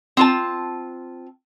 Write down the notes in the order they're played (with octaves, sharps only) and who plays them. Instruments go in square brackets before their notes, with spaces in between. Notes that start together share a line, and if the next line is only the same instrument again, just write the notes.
[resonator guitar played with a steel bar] C4 F4 A5